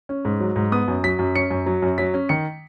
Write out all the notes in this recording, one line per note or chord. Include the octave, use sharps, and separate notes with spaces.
C#4
G#2
F#3
G#2
B3 D#6
F#2
F#3 B6
F#2
C#4 C#7
F#2
F#3
F#2
F#3 B6
C#4
D#3 C#7